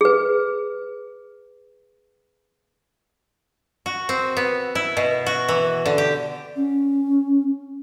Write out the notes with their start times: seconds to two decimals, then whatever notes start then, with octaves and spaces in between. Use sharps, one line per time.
0.01 G#4 B4
3.86 F#4
4.09 C4
4.37 B3
4.75 E4
4.97 B2
5.26 F#4
5.48 E3
5.86 D3
5.98 G4
6.56 C#4